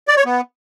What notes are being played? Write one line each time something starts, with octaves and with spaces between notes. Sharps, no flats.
D5
C#5
B3